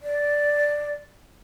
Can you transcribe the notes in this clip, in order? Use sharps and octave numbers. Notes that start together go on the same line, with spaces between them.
D5